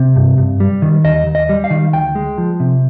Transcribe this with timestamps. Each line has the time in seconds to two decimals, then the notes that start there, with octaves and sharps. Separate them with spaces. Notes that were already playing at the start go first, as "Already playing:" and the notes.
Already playing: C3
0.16 G2
0.38 G2
0.60 G3
0.82 D#3
1.04 D#2 D#5
1.26 D#2
1.35 D#5
1.49 G3
1.64 F5
1.71 D#3
1.93 D2 G5
2.15 G#3
2.38 F3
2.60 C3